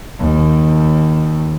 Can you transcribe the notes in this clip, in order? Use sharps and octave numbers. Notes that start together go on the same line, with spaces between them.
D#2